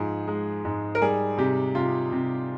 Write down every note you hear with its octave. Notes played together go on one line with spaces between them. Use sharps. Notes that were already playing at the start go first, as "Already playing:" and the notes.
Already playing: G#2 F3 G#4
G#3
G#2
A#4
G3 G#4
C3 G4
C3 F4
C3